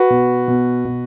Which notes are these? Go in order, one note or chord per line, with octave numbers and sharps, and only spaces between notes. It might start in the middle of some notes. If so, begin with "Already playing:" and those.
Already playing: F#4 B4
B2
B2
B2